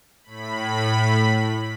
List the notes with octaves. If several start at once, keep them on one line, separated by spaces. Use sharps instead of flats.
A2 B5